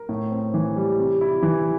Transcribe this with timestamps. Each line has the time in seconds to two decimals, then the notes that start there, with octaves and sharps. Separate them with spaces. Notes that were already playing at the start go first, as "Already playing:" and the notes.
Already playing: A#4
0.09 A2
0.31 C4
0.54 E3
0.76 G3
0.99 C3
1.21 E4
1.42 E3